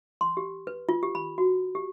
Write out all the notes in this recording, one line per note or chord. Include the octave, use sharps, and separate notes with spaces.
C6
G4
B4
F4
G4
B5
F#4
G4